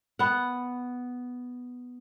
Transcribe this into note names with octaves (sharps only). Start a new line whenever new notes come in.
B3 F#5